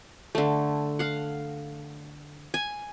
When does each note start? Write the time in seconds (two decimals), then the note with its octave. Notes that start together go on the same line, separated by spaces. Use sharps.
0.35 D3 A3
0.99 F5 F#5
2.54 G#5